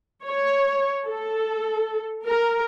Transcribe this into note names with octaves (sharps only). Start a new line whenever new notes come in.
C#5
A4
A#4